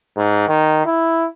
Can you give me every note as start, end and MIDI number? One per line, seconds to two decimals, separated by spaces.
0.16 0.47 44
0.48 0.83 51
0.86 1.27 64